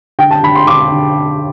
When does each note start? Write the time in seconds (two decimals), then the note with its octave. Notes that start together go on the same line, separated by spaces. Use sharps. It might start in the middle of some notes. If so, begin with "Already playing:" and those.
0.19 D3 G5
0.31 A5
0.43 D3 B5
0.55 C6
0.67 D3 D6
0.92 D3